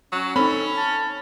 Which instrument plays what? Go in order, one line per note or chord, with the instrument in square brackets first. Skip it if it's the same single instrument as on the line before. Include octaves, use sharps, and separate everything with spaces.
[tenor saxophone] F#3 [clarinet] C#4
[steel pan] C4 D#4 [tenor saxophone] C#4 [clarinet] A4 [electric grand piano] B5
[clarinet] A5